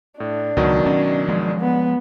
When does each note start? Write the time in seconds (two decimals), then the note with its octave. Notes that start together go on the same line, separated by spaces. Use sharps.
0.20 A2 D4
0.57 C#2 B2 D#3 F#3
0.86 C#4
1.28 F3 G#3
1.60 B3